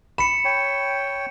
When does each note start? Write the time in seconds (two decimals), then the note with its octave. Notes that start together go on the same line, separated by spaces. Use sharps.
0.18 B5 C#7 E7
0.45 C#5 G5